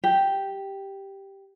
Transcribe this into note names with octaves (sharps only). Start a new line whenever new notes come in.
G4